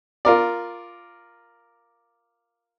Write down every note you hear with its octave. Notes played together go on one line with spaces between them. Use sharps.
F4 A#4 D5